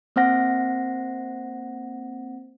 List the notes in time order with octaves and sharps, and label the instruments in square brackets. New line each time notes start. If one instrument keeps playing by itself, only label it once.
[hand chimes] A#3 C4 C5 F#5 A#6